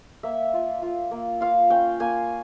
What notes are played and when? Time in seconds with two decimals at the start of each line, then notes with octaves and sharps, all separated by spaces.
0.23 A#3 E5
0.53 F4
0.82 F4
1.11 A#3
1.41 F4 F5
1.70 C#4 G5
2.00 A#3 G#5